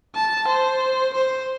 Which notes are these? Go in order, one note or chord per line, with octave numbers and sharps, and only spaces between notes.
A5
C5
C5